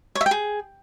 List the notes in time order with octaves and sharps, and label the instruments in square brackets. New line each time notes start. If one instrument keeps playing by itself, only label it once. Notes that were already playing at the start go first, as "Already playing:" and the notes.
[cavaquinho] C#5
E5
G5
G#4